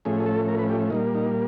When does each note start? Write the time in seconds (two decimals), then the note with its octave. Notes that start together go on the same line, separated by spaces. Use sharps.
0.05 A2 F3 A3 C#4 G#4
0.20 G#4
0.26 A4
0.48 A#4
0.59 B4
0.69 G4
0.90 A#2 G3 A#3 D#4
1.15 D#4